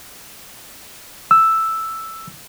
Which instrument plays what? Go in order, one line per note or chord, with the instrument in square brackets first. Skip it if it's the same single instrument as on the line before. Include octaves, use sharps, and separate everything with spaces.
[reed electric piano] E6